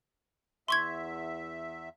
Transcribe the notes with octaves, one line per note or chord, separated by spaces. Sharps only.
E2 E5 C6 C#6 G#6